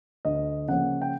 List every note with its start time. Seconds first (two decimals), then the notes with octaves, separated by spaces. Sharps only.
0.25 D2 D#5
0.68 C#3 F3 A#3 C#4 F#5
1.02 G5